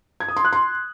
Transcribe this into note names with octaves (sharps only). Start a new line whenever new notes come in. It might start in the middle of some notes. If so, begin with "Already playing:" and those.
G#6
D#6
C6
F#6
C6